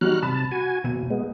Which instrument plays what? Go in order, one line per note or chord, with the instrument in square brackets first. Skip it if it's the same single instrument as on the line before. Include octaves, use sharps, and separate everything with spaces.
[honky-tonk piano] F#3 G3 D#4 [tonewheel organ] F#4 F6 F#6
[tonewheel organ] C3 A5 [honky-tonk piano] B5
[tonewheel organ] F#4 G#5
[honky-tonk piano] F#1 D#7 [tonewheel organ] B2
[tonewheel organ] G#3 B3